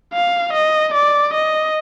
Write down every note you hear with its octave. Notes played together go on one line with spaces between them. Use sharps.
F5
D#5
D5
D#5